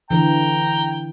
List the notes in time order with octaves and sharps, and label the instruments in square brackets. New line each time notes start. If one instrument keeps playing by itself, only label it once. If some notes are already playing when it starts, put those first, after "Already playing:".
[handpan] D3 E3 [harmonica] G5 A#5